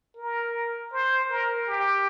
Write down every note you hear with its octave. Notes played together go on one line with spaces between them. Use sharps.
A#4
C5
A#4
G4